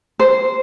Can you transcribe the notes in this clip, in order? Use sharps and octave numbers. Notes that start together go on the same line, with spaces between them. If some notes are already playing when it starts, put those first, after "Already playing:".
C5